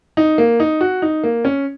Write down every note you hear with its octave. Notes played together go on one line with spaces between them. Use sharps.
D#4
A#3
D#4
F#4
D#4
A#3
C#4